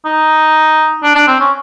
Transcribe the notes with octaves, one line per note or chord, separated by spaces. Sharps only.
D#4
D4
D4
C4
C#4